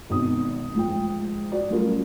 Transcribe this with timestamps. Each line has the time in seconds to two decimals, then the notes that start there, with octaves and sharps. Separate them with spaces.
0.10 G#1 B2 D#4 D#6
0.75 G#2 F3 G5
1.52 F#4 D5
1.70 F#3 G3 A3 C#4 F4 A#4